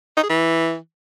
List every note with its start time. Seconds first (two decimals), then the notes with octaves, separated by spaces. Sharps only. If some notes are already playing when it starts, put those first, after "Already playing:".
0.17 D#4
0.23 G#4
0.29 E3